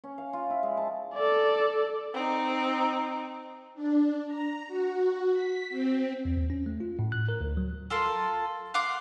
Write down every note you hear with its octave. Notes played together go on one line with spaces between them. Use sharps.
C#4
F5
F4
E4
G#3
A5
A4 D5
C4 D#4
D4
A#5
F#4
B6
C4
E2
D#2
C#4
A3
F4
A2
F#6
A#4
D2
F#3
F4 A4 A#4 C6
F5 F#5 C6 D6